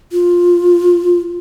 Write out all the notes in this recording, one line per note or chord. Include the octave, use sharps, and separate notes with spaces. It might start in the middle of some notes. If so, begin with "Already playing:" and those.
F4